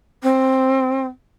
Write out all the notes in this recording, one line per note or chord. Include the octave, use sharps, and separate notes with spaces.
C4